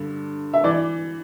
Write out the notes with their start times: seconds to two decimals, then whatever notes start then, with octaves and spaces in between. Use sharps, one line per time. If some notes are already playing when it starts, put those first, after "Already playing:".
Already playing: G2 D3
0.53 E5
0.64 E3 D5